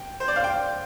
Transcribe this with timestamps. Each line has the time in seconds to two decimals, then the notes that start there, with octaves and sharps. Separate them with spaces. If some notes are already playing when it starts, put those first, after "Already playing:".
Already playing: G5
0.20 C5
0.28 D5
0.36 F5
0.44 G5